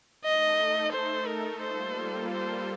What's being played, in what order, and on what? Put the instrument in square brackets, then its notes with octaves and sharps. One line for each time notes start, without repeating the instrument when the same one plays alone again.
[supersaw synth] A3 D#4 A4 [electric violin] D#5
[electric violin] C5
A#4
[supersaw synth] G3 A#3 F4 A4 [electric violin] C5
[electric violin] C5